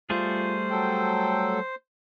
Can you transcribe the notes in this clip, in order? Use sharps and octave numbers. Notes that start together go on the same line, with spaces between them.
G3 A3 F4 G#4 C5
F#3 A4 G5